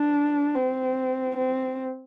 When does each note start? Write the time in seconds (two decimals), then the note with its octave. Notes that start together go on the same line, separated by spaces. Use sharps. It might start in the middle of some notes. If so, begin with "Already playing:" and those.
Already playing: D4
0.55 C4
1.37 C4